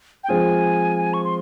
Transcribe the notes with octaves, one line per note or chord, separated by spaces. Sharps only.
G5
F3 G#3 C4 F4 G#4 G#5
C#6
C6